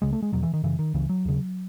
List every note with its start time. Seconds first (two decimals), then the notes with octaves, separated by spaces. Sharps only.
0.02 C#2 C#3 G#3
0.13 A3
0.22 G#3
0.32 E2 B2 F#3
0.43 E3
0.54 D#3
0.63 F#2 C#3 E3
0.79 D#3
0.94 C#2 C#3 E3
1.09 F#3
1.25 D#2 C#3